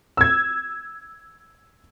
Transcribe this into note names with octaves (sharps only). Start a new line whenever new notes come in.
E6 G#6